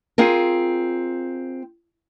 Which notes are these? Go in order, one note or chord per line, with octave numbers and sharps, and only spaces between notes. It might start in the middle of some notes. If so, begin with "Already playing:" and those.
C4 F4 G#4 A#4